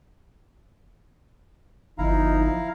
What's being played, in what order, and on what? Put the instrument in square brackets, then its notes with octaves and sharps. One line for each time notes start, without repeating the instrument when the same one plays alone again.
[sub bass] G1 [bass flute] F3 [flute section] D#4 [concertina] E4 F5 A#5